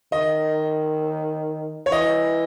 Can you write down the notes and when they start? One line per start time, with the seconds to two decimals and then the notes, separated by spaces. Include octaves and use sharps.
0.12 D#3 D#5
1.86 C#5
1.91 E3 D#5